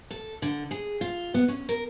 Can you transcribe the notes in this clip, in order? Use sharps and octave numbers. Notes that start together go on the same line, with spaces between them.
A4
D3
G#4
F4
B3
C#4
A#4